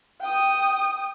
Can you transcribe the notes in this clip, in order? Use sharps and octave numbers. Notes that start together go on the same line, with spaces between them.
G5 D#6